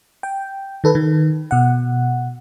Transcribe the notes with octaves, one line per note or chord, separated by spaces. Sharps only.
G5
D#3 A4 B4
D#3
B2 F#5